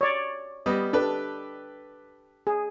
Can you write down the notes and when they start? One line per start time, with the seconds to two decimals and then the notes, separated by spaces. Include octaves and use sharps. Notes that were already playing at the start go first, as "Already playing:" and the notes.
0.01 C#5 D5
0.66 G3 B3 D#5
0.93 D4 G4 A4 B4
2.47 G#4